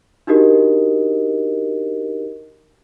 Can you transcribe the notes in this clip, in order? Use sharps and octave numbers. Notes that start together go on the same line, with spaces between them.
D4 D#4 F#4 G4 A#4 D#5